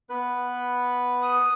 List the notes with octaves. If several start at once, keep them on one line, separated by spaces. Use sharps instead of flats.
B3 B4
D#6